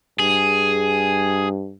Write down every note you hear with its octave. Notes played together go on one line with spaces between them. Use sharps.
G2 G#4